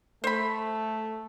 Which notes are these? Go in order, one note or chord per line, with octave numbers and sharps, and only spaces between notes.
A3 C5 B5